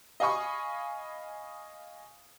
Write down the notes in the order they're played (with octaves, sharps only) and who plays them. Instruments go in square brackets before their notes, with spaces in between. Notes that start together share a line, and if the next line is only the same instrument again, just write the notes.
[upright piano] D#5 F5 G#5 B5 C#6 D#6